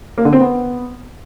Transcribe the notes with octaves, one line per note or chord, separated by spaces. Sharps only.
A#3
D3
C4
B3